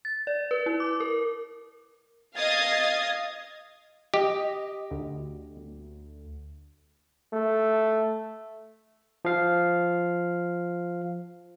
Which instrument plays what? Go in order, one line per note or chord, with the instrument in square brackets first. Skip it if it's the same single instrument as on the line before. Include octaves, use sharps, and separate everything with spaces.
[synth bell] A6
D5
B4
E4
D6
A#4
[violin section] D#5 F5 D#6 G#6 A6
[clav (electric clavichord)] G4 [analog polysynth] D#5
[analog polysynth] D2
[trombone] A3
[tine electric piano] F3 F5